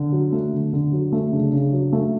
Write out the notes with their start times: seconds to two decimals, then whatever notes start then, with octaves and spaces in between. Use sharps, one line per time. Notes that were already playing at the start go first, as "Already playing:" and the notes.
Already playing: D3
0.12 F#3
0.32 A3
0.53 D3
0.73 D3
0.93 F#3
1.12 A3
1.32 C#3 D4
1.53 C#3
1.73 F#3
1.93 A3